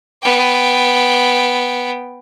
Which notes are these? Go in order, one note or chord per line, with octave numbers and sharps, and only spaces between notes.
B3 G5